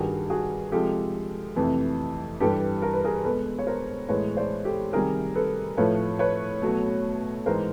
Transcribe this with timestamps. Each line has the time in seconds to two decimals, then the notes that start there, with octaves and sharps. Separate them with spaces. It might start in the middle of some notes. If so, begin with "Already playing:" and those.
Already playing: G2 D#3 G3 F#4 G#4
0.30 F#4 G#4
0.72 C3 F3 G#3 G4 A4
1.56 F2 C3 E3 A3
2.40 G2 E3 G3 G4 A4
2.82 A#4
2.94 B4
3.04 G#4 A#4
3.25 B2 G#3 A4 B4
3.59 C#5
3.67 A#4 C5
4.09 A2 E3 G#3 B4 C#5
4.37 C5 D5
4.65 G4 A4
4.93 C3 D#3 G3 G#4 A#4
5.35 A4 B4
5.77 A2 F3 A3 B4 C#5
6.19 B4 C#5
6.62 B2 F#3 A3
7.46 G#2 E3 G#3 A#4 C5